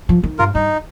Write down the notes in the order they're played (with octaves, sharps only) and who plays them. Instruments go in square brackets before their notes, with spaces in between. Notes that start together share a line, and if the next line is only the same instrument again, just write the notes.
[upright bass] F3
D#3
[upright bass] G2 [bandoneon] F4 A#4
[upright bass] G2 [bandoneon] D#4